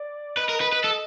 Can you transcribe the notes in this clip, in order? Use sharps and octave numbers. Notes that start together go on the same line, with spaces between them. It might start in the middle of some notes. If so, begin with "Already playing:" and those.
Already playing: D5
B4 D#5
A#4
B4
B4
A4